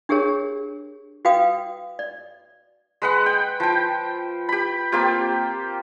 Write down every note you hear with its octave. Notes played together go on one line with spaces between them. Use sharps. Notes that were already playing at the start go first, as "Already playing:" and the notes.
D4 G4 G#4 A#4 C#5
F#4 B4 F5 G5 D#6
D5
G#3 B4 F#5
G5
F3 G5
G4 B5
A#3 C4 F4 G4